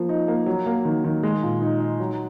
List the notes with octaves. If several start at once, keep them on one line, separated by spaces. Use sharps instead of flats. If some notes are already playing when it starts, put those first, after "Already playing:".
Already playing: F3 A#3
D#4
A#3
F#3
A#3
D#3
D#3
G#3
A#2
D#4
D#4
F#3